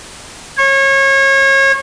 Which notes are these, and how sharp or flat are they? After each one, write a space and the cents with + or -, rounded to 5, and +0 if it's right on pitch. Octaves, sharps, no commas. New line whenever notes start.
C#5 -30